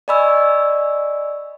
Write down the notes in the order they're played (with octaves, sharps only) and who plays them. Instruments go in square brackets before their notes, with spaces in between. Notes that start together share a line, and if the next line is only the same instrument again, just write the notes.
[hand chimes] D5 D#5 G#5 B5 C#6 E6